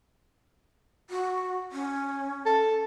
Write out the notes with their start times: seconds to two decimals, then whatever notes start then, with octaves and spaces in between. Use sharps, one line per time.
1.10 F#4
1.72 C#4
2.46 A4